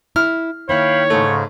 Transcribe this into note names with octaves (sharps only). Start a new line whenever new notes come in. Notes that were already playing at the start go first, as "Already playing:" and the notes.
E4 F6
D#3 A#3 E4 C#5 F5 G5 B5
G#2 C#3 A3